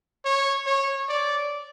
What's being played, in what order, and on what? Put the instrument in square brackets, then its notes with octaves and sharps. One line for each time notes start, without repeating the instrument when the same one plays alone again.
[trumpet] C#5
C#5
D5